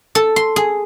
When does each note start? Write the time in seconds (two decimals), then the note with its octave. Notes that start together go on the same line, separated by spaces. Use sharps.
0.15 A4
0.36 C6
0.56 G#4